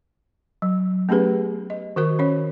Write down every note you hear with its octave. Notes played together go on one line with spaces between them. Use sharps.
F#3
A3 B3 C#4 G4 G#4 B4
D#5
D#3 F#4 A#4 C#6
C#4 C#5